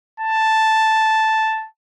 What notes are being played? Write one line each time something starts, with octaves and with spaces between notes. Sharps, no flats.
A5